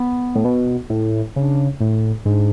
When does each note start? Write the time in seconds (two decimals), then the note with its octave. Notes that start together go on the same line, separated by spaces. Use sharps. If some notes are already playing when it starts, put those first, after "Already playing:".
Already playing: B3
0.35 A2
0.45 B2
0.90 A2
1.36 C#3 D4
1.80 A2
2.25 G#2 D4